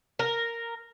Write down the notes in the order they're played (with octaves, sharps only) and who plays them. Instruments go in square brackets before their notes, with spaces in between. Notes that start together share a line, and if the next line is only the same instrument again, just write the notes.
[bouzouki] A#4